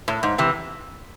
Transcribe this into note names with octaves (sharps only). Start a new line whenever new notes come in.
A2
G#2
C3 E3